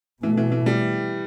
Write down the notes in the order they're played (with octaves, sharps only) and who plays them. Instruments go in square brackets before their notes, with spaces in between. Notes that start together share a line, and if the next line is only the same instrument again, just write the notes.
[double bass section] B2 A3 [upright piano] E3
[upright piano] E3
E3
G3